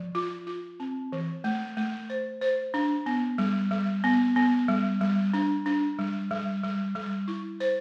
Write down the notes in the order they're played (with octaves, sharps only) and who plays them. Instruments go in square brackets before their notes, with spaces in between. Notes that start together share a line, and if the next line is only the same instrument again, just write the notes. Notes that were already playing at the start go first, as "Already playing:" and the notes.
Already playing: [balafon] F3
F4
F4
C4
E3
A3
A3
C5
C5
D4
B3
G3
G3
B3
B3
G3
G3
D4
D4
G3
G3
G3
G3
E4
C5